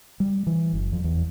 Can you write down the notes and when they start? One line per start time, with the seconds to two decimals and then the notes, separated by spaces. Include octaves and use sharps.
0.20 G3
0.47 E3
0.73 F#1
0.92 F2
1.04 E2